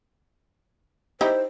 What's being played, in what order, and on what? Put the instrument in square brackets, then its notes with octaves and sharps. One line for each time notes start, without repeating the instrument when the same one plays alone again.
[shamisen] D#4 E4 G4 [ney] C5